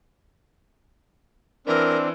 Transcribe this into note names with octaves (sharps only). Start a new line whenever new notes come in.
E3 C4 D4 A#4